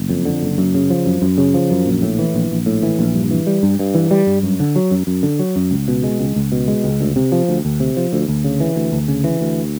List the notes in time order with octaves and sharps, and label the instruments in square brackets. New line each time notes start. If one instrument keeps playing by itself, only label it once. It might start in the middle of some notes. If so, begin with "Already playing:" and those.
Already playing: [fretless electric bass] F#1
F2
D3
F#1
F#2
C#3
F3
F#2
F#2
C#3
F3
F#2
A#1
A2
E3
A#1
A#1
A2
E3
A#1
G2
E3
G3
G2
G2
E3
G3
G2
F#2
D3
F#3
F#2
F#2
D3
F#3
F#2
C#2
B2
G#3
C#2
C#2
B2
G#3
C#2
D2
C3
F3
D2
D2
C3
F3
D2
D2
C#3
E3
D2
D2
C#3
E3
D2